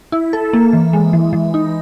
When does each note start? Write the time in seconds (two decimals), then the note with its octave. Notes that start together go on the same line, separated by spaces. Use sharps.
0.12 E4
0.33 A4
0.53 A#3
0.73 E3
0.93 G#3
1.13 E3
1.33 E3
1.54 D#4